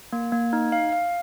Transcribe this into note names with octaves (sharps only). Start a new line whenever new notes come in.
A#3
A#3
D#4
F5
F5